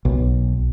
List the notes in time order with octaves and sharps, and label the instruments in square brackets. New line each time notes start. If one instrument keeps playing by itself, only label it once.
[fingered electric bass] B1